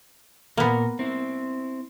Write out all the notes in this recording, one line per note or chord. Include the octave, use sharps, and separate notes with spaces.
A#2 A#3 B3 A#4
C4 E4